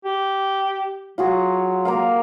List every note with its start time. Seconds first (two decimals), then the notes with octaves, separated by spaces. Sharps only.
0.05 G4
1.18 F#3 F4 F#4 G#4
1.85 A#3 A#4 F5